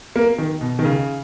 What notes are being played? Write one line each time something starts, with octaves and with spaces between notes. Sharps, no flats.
A#3
D#3
B2
D#3
C#3